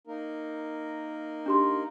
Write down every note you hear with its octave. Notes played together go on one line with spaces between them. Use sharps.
A#3 D#4 A#4
D4 G4 C6